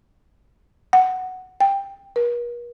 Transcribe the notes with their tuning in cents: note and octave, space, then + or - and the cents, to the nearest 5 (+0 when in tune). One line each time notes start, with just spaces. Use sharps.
F#5 +5
G5 +10
A#4 +45